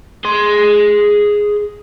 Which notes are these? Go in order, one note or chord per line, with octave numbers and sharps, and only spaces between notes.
G#4 C6